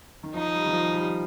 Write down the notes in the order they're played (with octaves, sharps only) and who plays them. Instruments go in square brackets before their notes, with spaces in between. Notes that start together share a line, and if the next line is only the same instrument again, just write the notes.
[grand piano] D#3
[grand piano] F3 [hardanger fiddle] D#4
[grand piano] G3
D#3
F3
G3